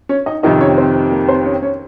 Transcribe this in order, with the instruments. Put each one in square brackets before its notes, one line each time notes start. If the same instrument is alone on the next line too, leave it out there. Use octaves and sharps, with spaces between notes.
[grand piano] C#4 C#5
D#4 D#5
[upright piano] F2 C3 D#3 [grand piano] D#4 D#5
[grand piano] C#4 C#5
C4 C5
A#3 A#4
C4 C5
C#4 C#5
C#4 C#5